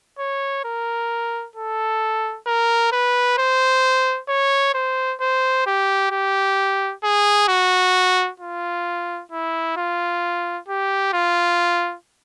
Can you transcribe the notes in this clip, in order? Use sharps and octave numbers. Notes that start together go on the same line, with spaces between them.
C#5
A#4
A4
A#4
B4
C5
C#5
C5
C5
G4
G4
G#4
F#4
F4
E4
F4
G4
F4